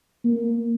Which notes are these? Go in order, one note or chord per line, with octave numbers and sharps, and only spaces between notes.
A#3